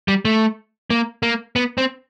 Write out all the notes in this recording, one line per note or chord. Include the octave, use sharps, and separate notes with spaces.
G3
A3
A#3
A#3
B3
C4